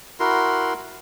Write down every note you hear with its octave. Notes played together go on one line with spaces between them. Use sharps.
E4 F#4 A#4 C6